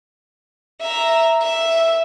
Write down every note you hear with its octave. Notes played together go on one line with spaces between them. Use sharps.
E5 A#5
E5